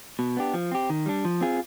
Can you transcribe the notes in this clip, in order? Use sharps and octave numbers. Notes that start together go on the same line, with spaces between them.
B2
B3 D4 G4
F3
C4 G4
D#3
G3 D4
F3
C4 F4 G#4